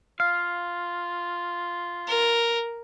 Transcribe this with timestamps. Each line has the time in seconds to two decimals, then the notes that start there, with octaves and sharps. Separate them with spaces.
0.20 F4 F5
2.07 A#4